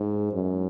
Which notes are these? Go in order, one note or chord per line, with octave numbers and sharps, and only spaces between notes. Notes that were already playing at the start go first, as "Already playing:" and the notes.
Already playing: G#2
F#2